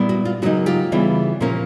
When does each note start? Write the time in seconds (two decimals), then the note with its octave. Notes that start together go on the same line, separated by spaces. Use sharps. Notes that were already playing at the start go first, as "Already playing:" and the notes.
Already playing: A#2 G3 B3 E4
0.09 F#4
0.25 F4
0.42 C#3 F#3 A#3 D#4 F#4
0.66 F4 G4
0.92 C#3 E3 G3 B3
1.40 A#2 F3 A#3 C#4